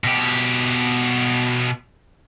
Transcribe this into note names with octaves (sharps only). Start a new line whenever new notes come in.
B2 G4